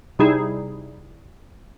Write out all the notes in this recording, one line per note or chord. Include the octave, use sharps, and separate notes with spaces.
C3 G3 D#4 E4 G#4